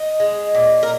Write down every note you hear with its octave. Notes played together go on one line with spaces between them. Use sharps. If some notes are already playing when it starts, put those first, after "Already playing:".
Already playing: D#5
G#3
A#2
A#4